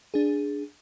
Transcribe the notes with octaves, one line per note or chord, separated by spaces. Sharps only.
D4 G#4